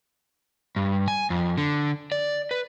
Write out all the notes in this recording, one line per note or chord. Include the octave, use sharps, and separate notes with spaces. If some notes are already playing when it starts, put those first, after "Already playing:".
G2
G#5
F2
D3
D5
B4